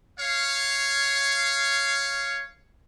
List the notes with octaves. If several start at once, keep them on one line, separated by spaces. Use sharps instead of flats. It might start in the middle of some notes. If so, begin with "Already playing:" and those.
C#5 F5